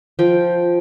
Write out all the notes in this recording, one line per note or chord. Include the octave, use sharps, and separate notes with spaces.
F3 G5